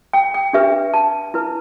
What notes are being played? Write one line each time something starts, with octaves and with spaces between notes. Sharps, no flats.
G5
G5
D4 G4 B4 E5
A5
E4 B4